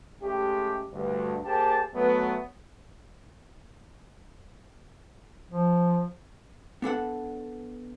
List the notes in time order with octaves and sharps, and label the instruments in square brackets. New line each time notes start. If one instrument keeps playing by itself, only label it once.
[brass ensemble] G#3 A3 C#4 G4
D2 G2
A#3 G4 G#4 C5 G5 A5
F#3 A3 B3
[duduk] F3
[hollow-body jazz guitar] B3 D4 A4 F#5